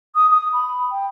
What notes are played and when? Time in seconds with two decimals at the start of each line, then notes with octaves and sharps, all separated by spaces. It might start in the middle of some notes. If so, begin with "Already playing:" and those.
0.15 D#6
0.30 D#6
0.52 B5
0.91 G5